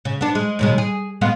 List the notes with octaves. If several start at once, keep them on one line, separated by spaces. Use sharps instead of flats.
C#3
B3 D4
G#3
D#2 B2 G#3
G#4
G#3 B3 F4